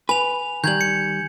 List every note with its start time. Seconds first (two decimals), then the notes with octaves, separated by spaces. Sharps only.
0.09 B4 G#5 F7
0.64 D#3 G3 G6 G#6 F#7
0.81 C#7